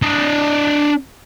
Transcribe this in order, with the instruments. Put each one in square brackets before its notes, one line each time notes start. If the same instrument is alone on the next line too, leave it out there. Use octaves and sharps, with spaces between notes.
[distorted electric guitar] D4 D#5